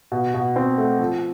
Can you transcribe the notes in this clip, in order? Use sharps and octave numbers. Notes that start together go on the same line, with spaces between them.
B2
B2
C4
A3
F3